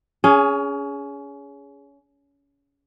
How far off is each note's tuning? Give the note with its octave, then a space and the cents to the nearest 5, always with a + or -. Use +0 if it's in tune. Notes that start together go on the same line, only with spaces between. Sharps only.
C#4 +25 G#4 +0